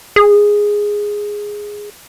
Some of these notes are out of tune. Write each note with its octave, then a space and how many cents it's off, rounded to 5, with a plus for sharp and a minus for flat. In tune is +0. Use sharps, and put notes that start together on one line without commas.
G#4 -5